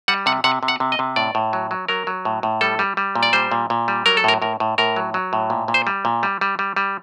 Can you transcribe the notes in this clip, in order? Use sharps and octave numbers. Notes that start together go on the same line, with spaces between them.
G3 F#5
C3 F#5
C3 F#5
C3
F#5
C3
D#5
C3
A2 D5
A2
F#3
F#3
F#3 A#4
F#3
A2
A2
G3 A4
G3
G3
A#2
D5
G3 C5
A#2
A#2
G3
F#3 A#4
A4
A2 A#4
A2 A#4
A2
A2 A#4
F#3
F#3
A2
A#2
A#2
C5
G3
A#2
G3
G3
G3
G3